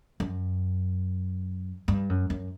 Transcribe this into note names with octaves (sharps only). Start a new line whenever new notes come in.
F#2
G2
F#2
F#2